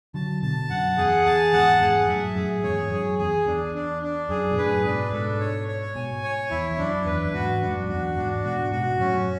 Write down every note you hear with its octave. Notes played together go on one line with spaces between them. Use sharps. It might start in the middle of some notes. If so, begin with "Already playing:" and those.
D3 F#3 A5
B2 D3 A5
F#2 F#5
E2 G#4
E2 A5
E2 G#2 F#5
E2 G#2 G#4
F#2 A2 E5
F#2 A2 G#4
E2 G#2 C#5
F#2 G#4
E2 G#4
E2 D4
D4
D4
F#2 G#4
B2
F#2 A2 B4
G#2 B2 D4
G#2 B2 A4
C#5
C#5
G#2 B2 G#5
C#5
E2 E4
E2
F#2 D4
E2 B4
F#2
E2 G#2 F#4
F#2 D4
G#2
F#2
E2 F#4
E2 G#2 D4
G#2 B2 F#4
G#2 B2 F#4
F#2 A2 C#4